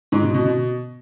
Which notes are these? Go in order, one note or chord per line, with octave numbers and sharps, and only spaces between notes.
G#2
B2
B2
B2